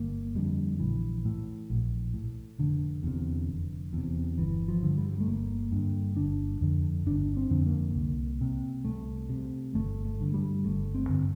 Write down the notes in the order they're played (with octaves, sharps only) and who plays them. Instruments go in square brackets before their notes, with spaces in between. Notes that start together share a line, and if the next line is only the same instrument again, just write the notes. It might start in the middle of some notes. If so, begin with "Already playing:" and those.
Already playing: [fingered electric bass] G1 A#3
F2 D3 G3
A#1 E3
A2
A#1
A2
F1 D3
E2 C3
F1
E2 C3
G1 E3
F3
G2 D3
G3
A3
G1 A#3
G2 D3
G1 D4
F2 D3
G1 D4
C4
F2 D3
A#3
C2
C3
C2 A3
C3
G1 A3
A3
G2 D3
G3
G1 A3
C4
G2 D3